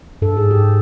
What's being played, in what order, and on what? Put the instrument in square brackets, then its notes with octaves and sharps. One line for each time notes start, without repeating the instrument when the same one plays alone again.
[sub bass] G2 [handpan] A4
[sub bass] G#2 [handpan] G#4
[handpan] G4